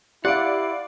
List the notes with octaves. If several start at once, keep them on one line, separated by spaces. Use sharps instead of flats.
E4 G4 D5 F5 F#5 D7